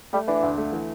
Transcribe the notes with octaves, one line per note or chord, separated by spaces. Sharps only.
G3 A3
E3 D4
D2
A3
E3